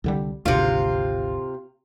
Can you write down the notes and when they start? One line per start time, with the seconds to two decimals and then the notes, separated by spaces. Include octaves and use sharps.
0.04 C2 D3 G3
0.45 G#1 D2 C3 F4